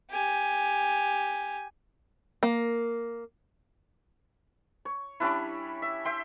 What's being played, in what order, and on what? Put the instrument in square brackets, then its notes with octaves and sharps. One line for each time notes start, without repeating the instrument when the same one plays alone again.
[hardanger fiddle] G4 G#5
[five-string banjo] A#3
[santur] C#5
G3 C#4 D4 E4
E5
E5 G5 C6